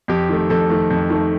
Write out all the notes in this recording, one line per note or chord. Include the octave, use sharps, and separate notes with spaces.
F2 G4
D#3 A3
F2 A4
D#3 A3
F2
D#3 A3